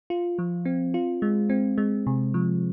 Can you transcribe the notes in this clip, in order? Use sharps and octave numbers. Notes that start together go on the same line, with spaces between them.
F4
F3
C4
F4
G#3
C4
G#3
C3
F3